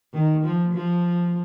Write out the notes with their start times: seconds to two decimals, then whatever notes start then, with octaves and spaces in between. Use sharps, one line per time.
0.14 D#3
0.44 F3
0.74 F3